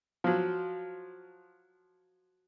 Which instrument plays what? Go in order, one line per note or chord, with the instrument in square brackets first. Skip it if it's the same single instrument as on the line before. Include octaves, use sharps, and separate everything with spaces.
[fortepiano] F3 F#3